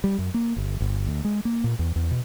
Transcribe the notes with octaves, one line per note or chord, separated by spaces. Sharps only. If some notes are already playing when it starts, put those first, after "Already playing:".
G3
F#2
A#3
G1
G1
D2
G#3
A#3
A#2
E2
E2
B2